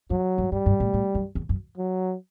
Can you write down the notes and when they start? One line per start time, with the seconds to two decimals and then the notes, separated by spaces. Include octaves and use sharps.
0.10 F#2 F#3
0.38 G2
0.52 G2 G3
0.66 G2
0.80 A2
0.94 A2
1.15 F#2
1.35 E2
1.49 F#2
1.77 F#3